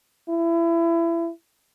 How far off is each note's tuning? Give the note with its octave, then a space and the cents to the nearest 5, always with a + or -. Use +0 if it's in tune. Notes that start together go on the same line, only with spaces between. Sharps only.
E4 +25